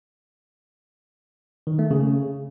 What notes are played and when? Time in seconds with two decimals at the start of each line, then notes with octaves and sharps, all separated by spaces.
1.67 D#3
1.79 A3
1.91 C#3